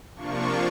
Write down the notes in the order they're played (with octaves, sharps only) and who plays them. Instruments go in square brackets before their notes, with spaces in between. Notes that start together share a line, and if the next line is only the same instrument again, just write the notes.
[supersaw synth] C3 F3 A#3 D4 F4 C#6